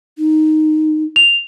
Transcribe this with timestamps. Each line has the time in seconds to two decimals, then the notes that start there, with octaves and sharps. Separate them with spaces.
0.18 D#4
1.16 F7